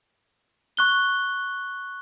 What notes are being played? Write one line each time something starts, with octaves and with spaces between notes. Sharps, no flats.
C#6 F#6 G7